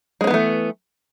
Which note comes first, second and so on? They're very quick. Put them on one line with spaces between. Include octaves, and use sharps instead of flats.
G#3 C#4 B3 E3 A3